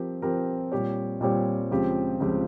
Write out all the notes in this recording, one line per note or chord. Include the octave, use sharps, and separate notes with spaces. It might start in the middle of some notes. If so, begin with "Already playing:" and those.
Already playing: F3 C4 G4 A#4
F3 C4 G4 A#4
A#2 G3 C4 G4 C#5
A#2 G3 C4 G4 C#5
C#2 C#3 F3 C4 G4
C#2 C#3 F3 C4 G4